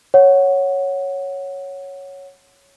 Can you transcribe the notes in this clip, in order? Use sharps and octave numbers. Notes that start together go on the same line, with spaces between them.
C#5 F#5